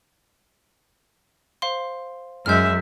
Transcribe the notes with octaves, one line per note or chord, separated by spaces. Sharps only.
C5 F5 C6
F#2 G#3 E5 F6 G6